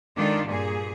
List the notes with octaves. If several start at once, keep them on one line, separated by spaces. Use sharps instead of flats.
D#3 G#3 D4 F4 A4 D5
G2 A#2 G#4